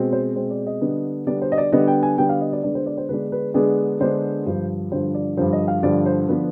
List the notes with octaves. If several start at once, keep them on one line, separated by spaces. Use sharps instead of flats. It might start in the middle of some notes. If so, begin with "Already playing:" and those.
Already playing: B2 G#3 C4
C5
B2 G#3 C4 C5
D5
D#5
D3 G3 B3 D4
D3 G3 B3 D4 D5
C5
D#5
D5
D3 G3 B3 D4 D#5
G5
G#5
D3 G3 B3 D4 G5
F5
D#5
D5
D3 G#3 B3 D4 D5
C5
D5
C5
D3 G#3 B3 D4 B4
B4
D3 G#3 B3 D4 G#4
D3 G#3 B3 D4 C5
G2 D3 F3
G2 D3 F3 C5
D5
G2 D3 F3 C5
D#5
F5
G2 D3 F3 D5
C5
D3 F3 B3 D4 B4